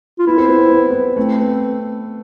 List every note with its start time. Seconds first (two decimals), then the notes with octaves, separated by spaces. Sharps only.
0.19 F4
0.27 B3 E4
0.38 C4
0.48 B3
0.59 C4
0.69 B3
0.79 C4
0.90 B3
1.16 A3 C4
1.39 B3